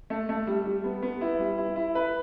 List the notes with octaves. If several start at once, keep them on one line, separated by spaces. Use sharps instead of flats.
A3
A3
G3
G3
B3
B3
E4
G3
E4
E4
B4